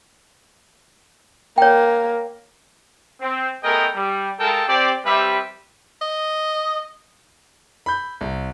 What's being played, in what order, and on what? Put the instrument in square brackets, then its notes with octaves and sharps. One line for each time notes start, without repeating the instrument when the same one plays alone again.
[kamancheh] A#3 [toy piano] C#5 G5
[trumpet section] C4
A3 B3 G#4 A#4 D#5 G5
G3
G#3 F4 A4 A#4 G5 A5
C4 G4 D5
G3 C4 G4 B4 E5
[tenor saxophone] D#5
[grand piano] B5 G6
C2